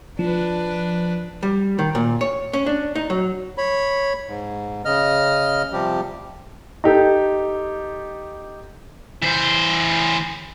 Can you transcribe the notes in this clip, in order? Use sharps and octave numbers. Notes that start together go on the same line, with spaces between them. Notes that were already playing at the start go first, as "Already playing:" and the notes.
F3 D4 B4
G3
D#3
A#2
C#5
C#4
D4
D#4
F#3
C#5 B5
G#2
C#3 D#5 F6
C3 F3 G3 G4
D#4 G4 A4
E3 C5